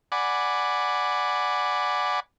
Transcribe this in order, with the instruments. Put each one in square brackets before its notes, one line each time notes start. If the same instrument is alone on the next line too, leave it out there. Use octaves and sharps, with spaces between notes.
[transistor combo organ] D5 F#5 G#5 B5 D6